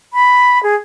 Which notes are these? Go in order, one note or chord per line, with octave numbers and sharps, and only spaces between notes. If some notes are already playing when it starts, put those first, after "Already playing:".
B5
G#4